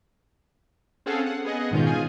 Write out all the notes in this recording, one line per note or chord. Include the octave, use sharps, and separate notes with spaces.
C4 C#4 G#4 A4 F5 F#5
F#5
B3 G#4 D#5 F#5
G#2 B2 D#3 C#4 F4 G6
F4 G#4 G#5